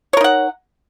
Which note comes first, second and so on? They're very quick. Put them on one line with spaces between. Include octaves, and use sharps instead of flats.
C#5 A#4 D#4 F#5